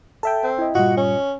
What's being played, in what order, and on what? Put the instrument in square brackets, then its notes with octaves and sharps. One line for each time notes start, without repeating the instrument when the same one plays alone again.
[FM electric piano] A4 E5 G5 [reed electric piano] A5
[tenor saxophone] C4
[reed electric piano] E4 D#5
[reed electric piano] G2 A#2 G3 [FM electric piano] F4 D#5 C#6 [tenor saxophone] F#4
[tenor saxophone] C#4